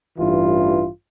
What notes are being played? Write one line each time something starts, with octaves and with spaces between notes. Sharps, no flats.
A1 G2 E3 F4